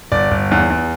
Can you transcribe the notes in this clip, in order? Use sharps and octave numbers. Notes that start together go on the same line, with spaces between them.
G1 D5
G1
E2
E2